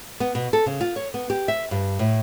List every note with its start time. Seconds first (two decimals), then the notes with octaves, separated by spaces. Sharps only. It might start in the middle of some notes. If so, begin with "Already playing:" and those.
0.20 B3
0.35 B2
0.53 A4
0.66 C#3
0.81 F4
0.96 C#5
1.14 B3
1.30 G4
1.48 E5
1.71 G2
1.99 A2